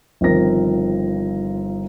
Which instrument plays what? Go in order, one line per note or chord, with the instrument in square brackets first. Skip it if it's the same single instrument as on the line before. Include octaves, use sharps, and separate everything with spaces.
[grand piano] G1 D#3 F3 C4 A#4 A#6